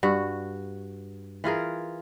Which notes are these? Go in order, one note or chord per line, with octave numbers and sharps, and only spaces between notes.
G2 F#4
E3 F4 G#4 A#4